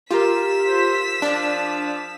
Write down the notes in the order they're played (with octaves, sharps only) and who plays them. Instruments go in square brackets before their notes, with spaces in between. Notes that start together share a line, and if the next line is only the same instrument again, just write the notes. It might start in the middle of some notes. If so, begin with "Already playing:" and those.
[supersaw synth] F4 [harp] G4 A#4 [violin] E6 B6
[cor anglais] C5
[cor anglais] F3 [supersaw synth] D4